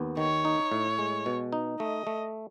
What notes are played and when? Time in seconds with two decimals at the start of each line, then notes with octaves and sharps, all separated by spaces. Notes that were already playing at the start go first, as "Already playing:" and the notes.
Already playing: D#2 B3
0.17 D#3 C#5
0.45 D#4
0.72 A2
0.99 G#3
1.26 B2
1.53 D#4
1.80 A3 D#5
2.07 A3